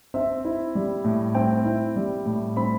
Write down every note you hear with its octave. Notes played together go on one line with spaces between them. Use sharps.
C4 E5
E4
G3
A2
C4 G5
E4
G3
A2
C4 B5